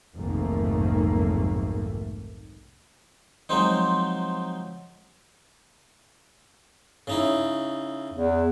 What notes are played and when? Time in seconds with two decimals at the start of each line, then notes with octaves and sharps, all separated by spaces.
0.15 F1 B1 G#2 D#3 A3 A#3
3.49 F3 F#3 G#3 C4 D#4
7.07 C#3 D#4 E4
8.14 E2